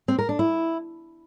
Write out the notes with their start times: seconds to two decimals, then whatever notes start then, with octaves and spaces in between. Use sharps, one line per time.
0.08 C4
0.19 A#4
0.29 D4
0.39 E4